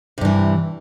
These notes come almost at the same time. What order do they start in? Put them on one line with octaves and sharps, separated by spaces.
C3 G2 E3